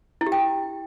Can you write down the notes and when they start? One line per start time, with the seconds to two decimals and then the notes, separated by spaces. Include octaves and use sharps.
0.21 E4
0.26 G4
0.32 G5